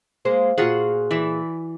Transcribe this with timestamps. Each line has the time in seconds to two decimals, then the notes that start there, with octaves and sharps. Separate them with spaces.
0.25 G#3 A#3 C5
0.58 A#2 F4 F#4 G#4 F#5
1.11 E3 D5 E5